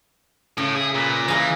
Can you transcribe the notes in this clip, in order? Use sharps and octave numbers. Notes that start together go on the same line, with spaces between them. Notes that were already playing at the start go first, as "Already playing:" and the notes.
A2 C#3
E4 G#4
A#2 B4
A#5
E3 F4 G#4 D#5 A#5